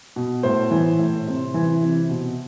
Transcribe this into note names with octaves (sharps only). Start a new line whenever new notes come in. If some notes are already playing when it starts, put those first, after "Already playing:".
B2
A2 C5
E3
A2
C3
E3
C3
B2